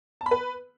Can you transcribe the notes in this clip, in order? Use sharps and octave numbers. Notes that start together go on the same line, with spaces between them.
A5
B5
B4